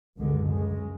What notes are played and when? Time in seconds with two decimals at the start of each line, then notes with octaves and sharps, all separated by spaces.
0.17 C#2 F#2 D3 G#3
0.47 C#3 G#3